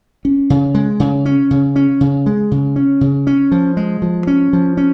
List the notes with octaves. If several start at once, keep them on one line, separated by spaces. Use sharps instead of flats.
C#4
C#3
G#3
C#3
C#4
C#3
C#4
C#3
G#3
C#3
C#4
C#3
C#4
F3
G#3
F3
C#4
F3
C#4